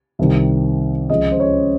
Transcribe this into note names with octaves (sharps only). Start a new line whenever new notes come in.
C2 C3 D#3
C#2 C#3 F3 D#5
C5
C#5